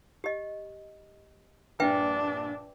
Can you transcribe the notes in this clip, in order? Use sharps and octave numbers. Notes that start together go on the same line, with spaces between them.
G4 D#5
A#1 G2 D4 B4 E5 G5